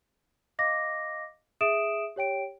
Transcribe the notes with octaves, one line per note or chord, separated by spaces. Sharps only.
D#5 F5 D6 A#6
G#4 E5 D#6 D7 E7
G4 C#5 G5 D7